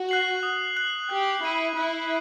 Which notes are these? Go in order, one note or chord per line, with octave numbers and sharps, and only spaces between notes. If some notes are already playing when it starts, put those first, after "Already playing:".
Already playing: F#4
F#6 C7 F#7
D#6
F#6 C7 F#7
G4 F#6
E4 C7 D#7 F#7
E4 F#6